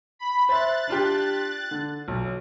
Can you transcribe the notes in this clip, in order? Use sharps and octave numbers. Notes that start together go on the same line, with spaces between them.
B5
C5 E5 F#6 A6
D4 F4 G4
D3
B1